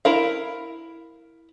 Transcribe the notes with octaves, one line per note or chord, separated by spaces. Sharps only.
E4 A#4 F5